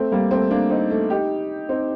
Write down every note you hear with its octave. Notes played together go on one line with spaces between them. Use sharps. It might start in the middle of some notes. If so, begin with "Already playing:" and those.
Already playing: A3 C4
G3 A#3
A3 C4
A#3 D4
C4 D#4
A3
D#4 G4
C4 D#4